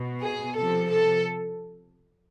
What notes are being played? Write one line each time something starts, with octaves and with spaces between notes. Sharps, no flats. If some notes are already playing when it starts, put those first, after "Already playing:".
Already playing: B2
G#4
C3 F3 A4
A4